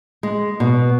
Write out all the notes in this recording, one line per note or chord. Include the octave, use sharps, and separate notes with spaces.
G#3
B2